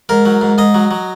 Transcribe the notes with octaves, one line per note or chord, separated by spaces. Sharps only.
G#2 A#4
F#3
G#2
G#2 D#5
F#3
F#3